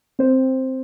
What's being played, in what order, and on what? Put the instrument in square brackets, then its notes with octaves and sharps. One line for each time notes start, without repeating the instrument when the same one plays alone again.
[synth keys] C4 C5